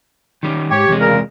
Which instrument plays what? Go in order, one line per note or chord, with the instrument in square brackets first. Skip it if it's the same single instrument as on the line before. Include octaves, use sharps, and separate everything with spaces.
[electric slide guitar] D#3 G3 C#4
[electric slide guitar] G#2 [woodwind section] G4 C#5
[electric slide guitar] E2 C3 G#3
[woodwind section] A#2 C#3 A#4